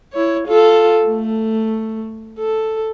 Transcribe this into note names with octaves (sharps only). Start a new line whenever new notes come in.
E4 C#5
F4 A4
A3
A4